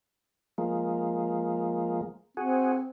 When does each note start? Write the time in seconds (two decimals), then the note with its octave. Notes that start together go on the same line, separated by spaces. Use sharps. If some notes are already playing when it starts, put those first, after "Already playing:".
0.58 F3 G#3 A#3
2.37 C4 F#4 G#4